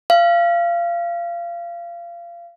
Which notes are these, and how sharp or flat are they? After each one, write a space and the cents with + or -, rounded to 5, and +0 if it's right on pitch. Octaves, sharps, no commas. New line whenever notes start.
F5 -25